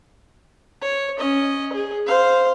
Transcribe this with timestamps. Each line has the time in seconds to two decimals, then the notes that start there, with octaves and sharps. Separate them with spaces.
0.81 C#5
1.18 C#4 D#5
1.73 G#4
2.07 C5 F5